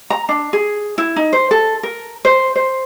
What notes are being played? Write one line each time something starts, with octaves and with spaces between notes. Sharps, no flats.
A#5
D4
G#4
E4
D#4
C5
A4
A#4
C5
C5